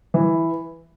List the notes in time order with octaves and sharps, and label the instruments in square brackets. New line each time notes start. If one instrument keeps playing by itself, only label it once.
[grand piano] E3